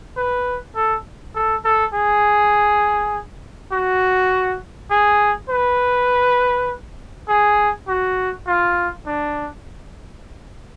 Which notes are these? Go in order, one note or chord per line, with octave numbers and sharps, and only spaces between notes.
B4
A4
A4
A4
G#4
F#4
G#4
B4
G#4
F#4
F4
D4